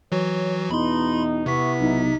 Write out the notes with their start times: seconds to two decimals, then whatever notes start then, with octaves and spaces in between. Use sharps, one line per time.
0.12 E3 F#3 F#4 C#5
0.71 E2 B2 D#4 E4 B5 C6
1.46 C3 B3 E4 C#6 B6
1.80 B1 D#4